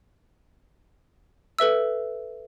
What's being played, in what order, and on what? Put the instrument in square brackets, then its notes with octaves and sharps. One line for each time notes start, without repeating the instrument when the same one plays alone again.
[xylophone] A4 B4 E5 E6